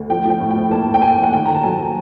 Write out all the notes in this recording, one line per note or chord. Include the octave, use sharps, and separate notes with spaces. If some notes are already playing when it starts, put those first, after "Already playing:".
Already playing: D2
F3 G5
F3 G5
A2
G5
F3
A#3 A5
A2
G5
A#3 G#5
F3
F#5
D#3 G5
D#3 A#5
A5
F#3 G#5
F#3